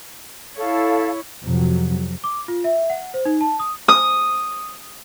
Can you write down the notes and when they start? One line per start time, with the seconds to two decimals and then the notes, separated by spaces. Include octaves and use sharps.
0.57 E4 A4 C#5 F5
1.42 F2 C3 F#3
2.24 D6
2.48 F4
2.64 E5
2.90 F#5
3.14 C5
3.25 D#4
3.41 A5
3.59 D#6
3.88 D#6